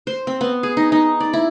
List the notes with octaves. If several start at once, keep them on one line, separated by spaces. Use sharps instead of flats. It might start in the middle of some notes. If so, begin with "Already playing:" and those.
C5
C4
B3
G#4
D#4
D#4
D5
E4